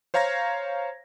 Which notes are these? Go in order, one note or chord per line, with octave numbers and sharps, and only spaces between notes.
C5 C#5 F5 A#5 G#6 A#6